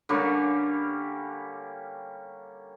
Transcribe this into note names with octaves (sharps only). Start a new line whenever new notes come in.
D3 G3 A#3 C#4